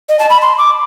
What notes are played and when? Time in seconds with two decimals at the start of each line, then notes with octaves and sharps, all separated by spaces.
0.09 D#5
0.19 A5
0.29 B5
0.42 C6
0.58 D6